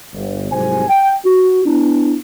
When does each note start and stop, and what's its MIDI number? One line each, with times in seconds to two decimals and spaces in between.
0.14 0.50 31
0.52 0.85 36
0.52 0.85 44
0.52 0.85 48
0.52 0.85 54
0.52 0.85 72
0.52 0.85 80
0.89 1.13 79
1.25 1.64 66
1.65 2.15 59
1.65 2.15 62
1.65 2.15 64